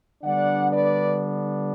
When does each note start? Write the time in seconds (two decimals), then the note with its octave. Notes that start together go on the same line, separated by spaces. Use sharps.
0.23 D3 G3 B3 D4 D5 F#5
0.71 B4 D5